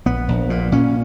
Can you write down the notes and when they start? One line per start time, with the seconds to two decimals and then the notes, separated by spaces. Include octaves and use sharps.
0.06 A#1 B3
0.28 A#1
0.50 A#2
0.72 A#2 C#4